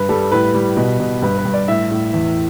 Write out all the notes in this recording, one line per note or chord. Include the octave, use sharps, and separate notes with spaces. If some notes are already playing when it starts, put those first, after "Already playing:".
Already playing: G2 B4
G3 A4
A2 B4
G3
B2
B2
G2 B4
B4
G2
D5
A2 E5
A2
E2